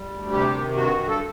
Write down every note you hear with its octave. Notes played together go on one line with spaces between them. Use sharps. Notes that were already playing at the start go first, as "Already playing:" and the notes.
Already playing: G3
D2
C3 G4
D#3
G2 F#4
G2
A4